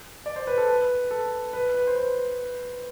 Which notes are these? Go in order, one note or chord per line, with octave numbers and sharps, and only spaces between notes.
D5
C5
B4
A4
B4
A4
B4
B4
C5
B4